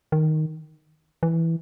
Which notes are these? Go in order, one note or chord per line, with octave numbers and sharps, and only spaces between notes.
D#3
E3